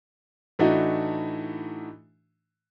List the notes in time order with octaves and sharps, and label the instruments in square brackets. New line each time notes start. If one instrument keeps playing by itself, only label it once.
[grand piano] A2 E3 A3 D4 D#4 F#4